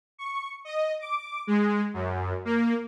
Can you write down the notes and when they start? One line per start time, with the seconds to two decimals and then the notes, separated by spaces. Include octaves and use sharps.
0.19 C#6
0.65 D#5
1.00 D6
1.47 G#3
1.94 F#2
2.45 A#3